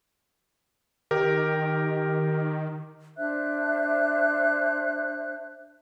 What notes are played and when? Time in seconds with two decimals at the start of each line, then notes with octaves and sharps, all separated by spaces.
1.11 D#3 G4 A#4
3.17 D4 C5 E5 F#6